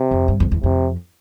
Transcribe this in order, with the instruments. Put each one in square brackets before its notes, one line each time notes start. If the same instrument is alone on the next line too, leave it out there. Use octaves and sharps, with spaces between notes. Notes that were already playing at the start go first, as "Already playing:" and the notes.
Already playing: [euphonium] C3
[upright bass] F2
G2
F2
E2
[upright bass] F2 [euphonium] C3